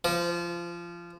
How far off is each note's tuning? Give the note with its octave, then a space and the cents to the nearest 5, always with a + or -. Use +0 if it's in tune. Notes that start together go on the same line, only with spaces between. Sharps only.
F3 -20